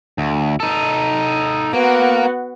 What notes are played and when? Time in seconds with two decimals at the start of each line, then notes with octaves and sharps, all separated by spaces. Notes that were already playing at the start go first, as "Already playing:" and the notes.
0.18 D2
0.60 D#4 A4
1.73 A#3 B3 F#4